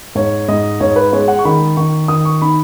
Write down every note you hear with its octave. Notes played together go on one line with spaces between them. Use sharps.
G#2 C#5
G#2 D#5
G#2 C#5
B4
G#3 C#5
F#5
C#6
D#3 B5
D#3 C#6
D#3 D#6
C#6
D#4 B5